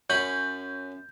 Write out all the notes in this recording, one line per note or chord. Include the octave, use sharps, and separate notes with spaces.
F#2 C#4 B5 G6